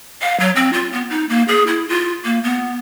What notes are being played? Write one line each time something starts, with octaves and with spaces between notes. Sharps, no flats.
F5
F#3
C4
F4
B3
D#4
A#3
G#4
E4
F4
A#3
B3